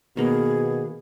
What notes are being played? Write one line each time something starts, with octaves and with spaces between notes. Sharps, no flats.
B2 D#3 A#3 B3 G#4